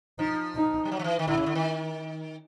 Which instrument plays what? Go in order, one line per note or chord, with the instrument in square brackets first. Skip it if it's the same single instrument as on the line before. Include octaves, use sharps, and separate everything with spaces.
[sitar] F3 [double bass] D#4
[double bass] D#4
[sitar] G3
F#3
F3
E3
D#3
[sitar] D3 [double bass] E4
[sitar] C#3
D3
D#3